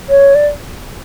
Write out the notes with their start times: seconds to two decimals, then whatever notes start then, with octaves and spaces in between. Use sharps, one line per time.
0.09 C#5
0.35 D5